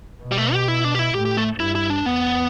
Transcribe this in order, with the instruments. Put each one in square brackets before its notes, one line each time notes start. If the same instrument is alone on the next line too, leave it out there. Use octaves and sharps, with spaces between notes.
[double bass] B2
[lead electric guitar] G3
A3
G4
E4
D4
G4
E4
[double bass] A2 [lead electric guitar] G4
[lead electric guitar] G4
A3
[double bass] G2 [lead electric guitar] E4
[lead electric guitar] E4
D4
[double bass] E2 [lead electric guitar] B3